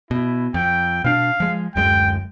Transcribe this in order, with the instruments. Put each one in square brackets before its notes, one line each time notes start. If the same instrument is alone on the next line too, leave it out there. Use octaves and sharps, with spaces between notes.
[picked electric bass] B2 [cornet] E4
[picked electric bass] F2 [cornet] G5
[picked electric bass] B2 C#4 D4 [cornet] F5
[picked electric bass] F3 G#3
[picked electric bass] D1 F#2 G#3 [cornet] G5